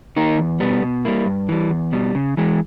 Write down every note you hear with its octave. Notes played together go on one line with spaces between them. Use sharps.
D#3 A#3 D#4
E2
B2 G3 B3
B2
G3 A#3 E4
G2
E3 G3
E2
B2 G3
C#3
E3 G#3